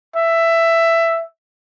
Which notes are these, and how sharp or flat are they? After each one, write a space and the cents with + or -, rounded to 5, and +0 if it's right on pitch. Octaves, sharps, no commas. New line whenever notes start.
E5 +10